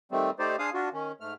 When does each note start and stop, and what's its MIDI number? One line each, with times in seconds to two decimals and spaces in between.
0.12 0.30 51
0.12 0.30 55
0.12 0.30 57
0.12 0.30 60
0.39 0.56 57
0.39 0.56 63
0.39 0.56 67
0.39 0.56 72
0.39 0.56 74
0.59 0.70 62
0.59 0.70 68
0.59 0.70 72
0.59 0.70 77
0.59 0.70 87
0.74 0.89 62
0.74 0.89 65
0.74 0.89 66
0.93 1.12 51
0.93 1.12 61
1.21 1.34 44
1.21 1.34 57
1.21 1.34 89